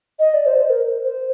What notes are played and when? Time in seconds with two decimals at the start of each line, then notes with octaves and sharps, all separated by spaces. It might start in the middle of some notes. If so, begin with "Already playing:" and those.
0.19 D#5
0.34 D5
0.46 C5
0.58 C5
0.70 A#4
1.04 C5